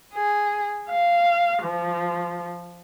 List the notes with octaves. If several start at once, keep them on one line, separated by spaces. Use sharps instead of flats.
G#4
F5
F3